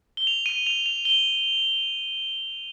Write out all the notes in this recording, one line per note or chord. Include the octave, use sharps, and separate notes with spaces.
G7
F7
D#7
F7
F7
G7